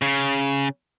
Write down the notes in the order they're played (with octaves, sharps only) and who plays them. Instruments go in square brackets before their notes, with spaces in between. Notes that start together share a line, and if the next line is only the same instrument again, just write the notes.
[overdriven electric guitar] C#3